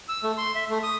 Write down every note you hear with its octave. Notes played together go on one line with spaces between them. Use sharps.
E6
A3
C6
E5
A3
D#6